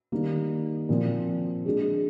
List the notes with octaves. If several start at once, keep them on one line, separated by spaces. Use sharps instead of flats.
D#3 G3 A#3
A#2 F3 C4
G#3 D4 G#4